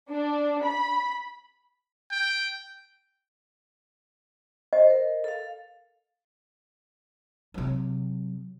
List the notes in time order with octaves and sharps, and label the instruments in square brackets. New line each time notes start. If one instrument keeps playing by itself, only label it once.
[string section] D4
B5
[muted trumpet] G5
[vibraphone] C5 [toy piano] D#5
[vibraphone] A#4
A4 F5
[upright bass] C3 F#3